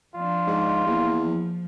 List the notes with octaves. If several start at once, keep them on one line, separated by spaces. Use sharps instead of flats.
F3 D4 F4
G#2
E2 A#3
F3